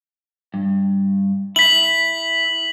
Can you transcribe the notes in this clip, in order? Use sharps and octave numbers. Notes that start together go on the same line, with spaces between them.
G2
E4 B6 F#7